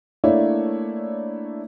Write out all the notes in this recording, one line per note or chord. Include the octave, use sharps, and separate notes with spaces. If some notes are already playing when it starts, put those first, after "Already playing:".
A3 A#3 D4 E4 C#5 D5